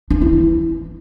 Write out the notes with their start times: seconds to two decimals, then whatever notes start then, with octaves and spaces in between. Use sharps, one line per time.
0.10 D4
0.22 E4
0.33 E3